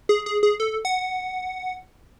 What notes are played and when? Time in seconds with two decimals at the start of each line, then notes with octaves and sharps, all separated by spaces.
0.09 G#4
0.26 G#4
0.43 G#4
0.60 A4
0.85 F#5